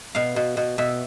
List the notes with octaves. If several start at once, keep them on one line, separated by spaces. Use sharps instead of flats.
B2 F5
B2
B2
B2 E5